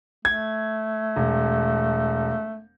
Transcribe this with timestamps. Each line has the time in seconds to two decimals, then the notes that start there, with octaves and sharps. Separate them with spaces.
0.25 A3 G#6
1.16 E1